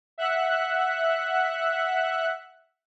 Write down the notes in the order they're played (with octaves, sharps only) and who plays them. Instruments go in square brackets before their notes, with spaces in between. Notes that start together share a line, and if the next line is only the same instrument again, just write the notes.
[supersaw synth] E5 F#5 F#6